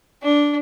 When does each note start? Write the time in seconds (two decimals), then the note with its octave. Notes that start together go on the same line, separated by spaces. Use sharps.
0.23 D4